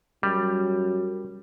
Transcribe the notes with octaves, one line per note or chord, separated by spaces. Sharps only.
F#2 G3